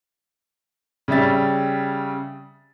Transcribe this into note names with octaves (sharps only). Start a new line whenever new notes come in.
C#3 G3 E5 A6